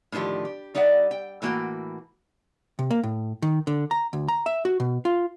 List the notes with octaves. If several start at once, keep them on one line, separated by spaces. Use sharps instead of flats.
A2 D3 D#3 F3 G4
G4
G3 D#4 D5 E5 F#5
G5
A2 E3 A#3 F#4 G5
C3
A#3
A2
D#3
D3
A#5
D2
A#5
E5
F#4
B2
F4